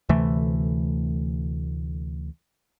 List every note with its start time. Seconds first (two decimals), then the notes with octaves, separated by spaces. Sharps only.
0.09 D2 C3 E3 A3